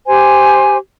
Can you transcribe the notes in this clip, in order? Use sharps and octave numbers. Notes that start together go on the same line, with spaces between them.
G4 C5 G#5